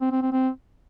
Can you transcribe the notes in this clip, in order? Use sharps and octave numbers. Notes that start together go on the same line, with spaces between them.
C4
C4
C4
C4